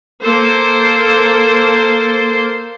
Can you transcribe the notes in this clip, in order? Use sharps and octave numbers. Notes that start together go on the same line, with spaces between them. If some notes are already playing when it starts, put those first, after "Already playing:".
A#3 A4 C5